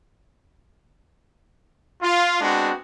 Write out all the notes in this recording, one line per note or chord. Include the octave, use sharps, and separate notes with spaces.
F4
G#3 B3 C4 D4 F#4